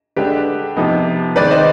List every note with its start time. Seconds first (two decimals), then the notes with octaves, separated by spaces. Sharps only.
0.16 D3 G#3 D4 G4 B4
0.77 C3 F3 B3 D#4
1.36 D#3 G#3 C4 B4 D5
1.51 C5 D#5